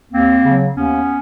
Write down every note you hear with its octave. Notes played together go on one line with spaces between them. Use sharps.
D#2 A#3 C4
C#3 F#3
D#2 B3 C#4